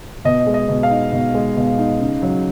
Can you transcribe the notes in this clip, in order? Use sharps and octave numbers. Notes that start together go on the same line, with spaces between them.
B2 D#5
G#3
D#5
B2
F5
D#4
B2
G#3
B2
D#4
C#3
F#3